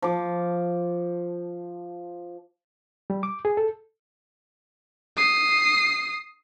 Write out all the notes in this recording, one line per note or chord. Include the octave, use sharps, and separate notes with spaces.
F3 D6
G3
D6
G#4
A4
D#6 C7